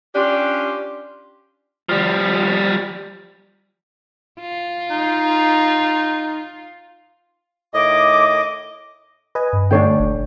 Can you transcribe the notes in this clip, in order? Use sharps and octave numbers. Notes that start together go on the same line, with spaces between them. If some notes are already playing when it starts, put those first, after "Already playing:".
C#4 D4 F4 G4
F3 G3
F4
D#4
A2 D#3 D#5 D6
B4 D#5 G#5
G2
A#2 D3 A3 D4 C#5 G5
F#1